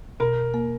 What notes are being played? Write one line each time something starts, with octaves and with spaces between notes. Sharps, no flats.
B2 A#4
A#3